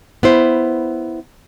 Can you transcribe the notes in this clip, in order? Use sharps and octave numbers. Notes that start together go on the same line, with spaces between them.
B3 E4 C5